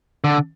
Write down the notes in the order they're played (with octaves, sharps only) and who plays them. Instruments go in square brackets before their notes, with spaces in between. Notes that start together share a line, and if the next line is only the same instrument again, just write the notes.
[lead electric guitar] D3